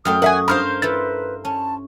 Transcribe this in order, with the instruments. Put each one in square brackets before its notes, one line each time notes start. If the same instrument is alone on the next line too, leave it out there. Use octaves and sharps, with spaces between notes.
[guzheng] F#2 F#3 A3 [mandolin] G5 F6 [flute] D#6
[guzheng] F#3 F#4 [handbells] A#4 E5 [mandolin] F#5 G#5
[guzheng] G2 [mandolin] A#4 C5 F5 [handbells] B5 F6
[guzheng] E4 F4 A4 [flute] B4 [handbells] A6
[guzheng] C#4 [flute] A5